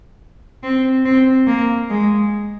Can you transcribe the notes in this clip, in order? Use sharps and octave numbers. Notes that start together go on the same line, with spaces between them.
C4
C4
A#3
G#3